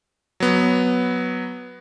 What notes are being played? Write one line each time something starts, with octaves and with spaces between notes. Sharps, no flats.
F#3 B3